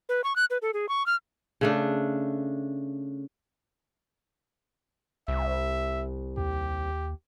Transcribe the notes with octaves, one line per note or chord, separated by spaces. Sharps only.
B4
C#6
F#6
B4
A4
G#4
C#6
F6
C#3 A3 D4
C2 E5
D#2 G4